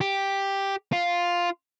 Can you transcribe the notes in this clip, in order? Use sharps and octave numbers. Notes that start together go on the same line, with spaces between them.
G4
F4